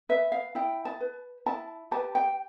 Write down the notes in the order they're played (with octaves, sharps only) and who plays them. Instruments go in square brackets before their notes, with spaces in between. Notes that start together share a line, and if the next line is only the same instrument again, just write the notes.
[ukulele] B4 E5
F5
E4 G5
A5
B4
E4 A5
G4 B4 A5
G5